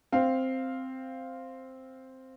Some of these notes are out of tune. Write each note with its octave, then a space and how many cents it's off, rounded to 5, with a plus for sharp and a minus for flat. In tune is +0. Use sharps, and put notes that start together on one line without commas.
C4 +0 F5 +0